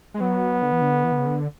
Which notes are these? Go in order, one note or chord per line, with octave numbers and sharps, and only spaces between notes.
G#3
F#3 B3
D3
E3
D3
E3
D3
C#3
D3